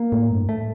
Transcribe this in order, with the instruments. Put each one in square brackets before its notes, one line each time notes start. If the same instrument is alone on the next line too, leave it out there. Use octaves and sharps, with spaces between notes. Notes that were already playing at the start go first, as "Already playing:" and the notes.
Already playing: [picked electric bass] A#3
[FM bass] A2
G2
[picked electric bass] A3